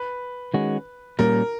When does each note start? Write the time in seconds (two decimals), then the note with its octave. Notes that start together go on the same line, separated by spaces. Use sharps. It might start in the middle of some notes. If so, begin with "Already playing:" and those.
Already playing: B4
0.54 D#3 G#3 C#4 F#4
1.19 A#2 G3 A#3 C#4 A#4